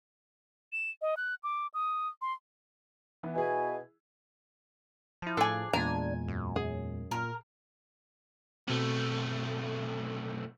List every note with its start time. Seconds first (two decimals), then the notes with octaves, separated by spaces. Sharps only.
0.73 E7
1.02 D#5
1.17 F#6
1.43 D6
1.74 D#6
2.22 C6
3.23 E3 B3
3.35 B2 E4 G#4 G#5
5.22 F3 E4 A5
5.37 A2 D4 G#4 A4 G#5 D6
5.73 E2 A#2 G#3 D4 G#5 A#5
6.28 F#2
6.56 G#4
7.11 A#2 A#4
8.68 B1 B2 A3 C4